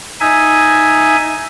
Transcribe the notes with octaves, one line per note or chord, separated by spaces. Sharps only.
D#4 E5 G#5